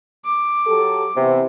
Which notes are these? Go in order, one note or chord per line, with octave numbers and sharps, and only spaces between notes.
D6
F#3 G4 A4
C3 E3 B3 C4